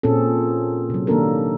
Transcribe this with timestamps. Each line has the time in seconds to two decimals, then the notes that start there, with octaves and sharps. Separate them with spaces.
0.03 A#2 C4 C#4 G#4 A4
0.90 C3 F#3
1.07 D#3 A#3 D4 A4 A#4